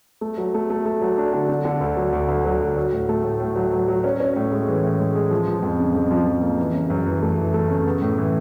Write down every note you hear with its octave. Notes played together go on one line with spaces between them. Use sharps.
A3
F#3
A3
A3
A3
F#3
D4
D3
D3
D3
D2
F#3
D2
D2
F#3
D2
F#3
A2
A3
A2
A2
F#3
F#3
F#3
C#4
C#4
A2
G#3
E3
A2
G#3
G#3
F3
F3
F2
C#3
F2
F3
F3
A#3
E3
C#3
F#2
E3
A3
E3
A3
C#3
B3
A2
E3